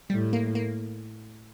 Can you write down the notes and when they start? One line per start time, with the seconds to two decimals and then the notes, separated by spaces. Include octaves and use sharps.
0.10 A2 G3
0.33 A#3
0.55 A#3